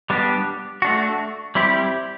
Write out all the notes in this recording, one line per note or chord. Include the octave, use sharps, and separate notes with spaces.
G3 B3 D4 G4
A3 D4 F#4
G3 C4 E4 G4